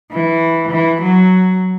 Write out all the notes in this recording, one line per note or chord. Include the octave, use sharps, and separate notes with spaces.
E3
E3
F#3